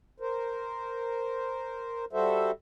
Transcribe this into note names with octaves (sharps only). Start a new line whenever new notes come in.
A#4 C5
G3 F#4 A4 C5 E5